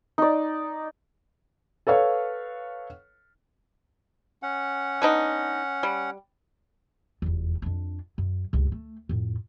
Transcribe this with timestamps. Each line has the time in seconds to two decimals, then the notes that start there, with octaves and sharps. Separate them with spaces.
0.18 D#4 D5
1.87 A4 B4 C#5 F5
4.43 C#4 F#5
5.02 B3 D4 D#4
5.83 G3
7.22 F1 E2
7.62 F2 D4
8.18 F#2
8.53 C#2 G2
8.72 A3
9.09 F2 A2